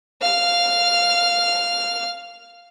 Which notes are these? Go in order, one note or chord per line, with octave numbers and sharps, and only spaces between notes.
F5 F6